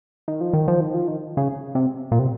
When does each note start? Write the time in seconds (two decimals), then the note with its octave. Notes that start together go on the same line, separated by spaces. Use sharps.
0.28 D#3
0.41 F3
0.53 D#3
0.68 F3
0.81 D#3
0.94 F3
1.08 D#3
1.37 C#3
1.75 C3
2.12 A#2
2.19 C3